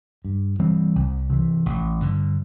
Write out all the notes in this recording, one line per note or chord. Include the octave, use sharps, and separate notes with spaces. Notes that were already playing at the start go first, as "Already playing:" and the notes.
G2
E3 G3 C4
C2
C3 E3
A1
G2 D3